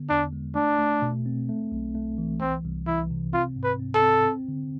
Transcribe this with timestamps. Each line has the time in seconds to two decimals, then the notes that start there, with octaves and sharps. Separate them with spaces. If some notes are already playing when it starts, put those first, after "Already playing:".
Already playing: D3 B3
0.10 E2 D4
0.33 G#3
0.55 A3 D4
0.79 A3
1.02 B2
1.26 C4
1.49 A3
1.72 B1
1.95 A3
2.18 E3
2.41 C2 C4
2.64 C2
2.87 E3 E4
3.11 C3
3.33 C4 F4
3.56 G#2
3.64 B4
3.80 C4
3.95 A4
4.02 C4
4.25 C4
4.48 D3